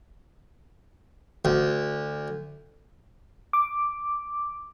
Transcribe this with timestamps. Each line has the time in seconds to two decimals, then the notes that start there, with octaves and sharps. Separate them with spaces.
1.45 D2
3.53 D6